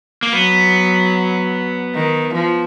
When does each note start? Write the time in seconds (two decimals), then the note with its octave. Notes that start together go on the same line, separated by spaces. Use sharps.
0.23 A#3
0.33 F#3 B3
1.95 D#3
2.34 F3